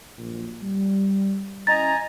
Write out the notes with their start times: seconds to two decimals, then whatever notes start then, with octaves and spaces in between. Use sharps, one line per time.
0.18 A#1 F#2
0.62 G3
1.67 C#4 E4 D#5 G#5 A#5 A6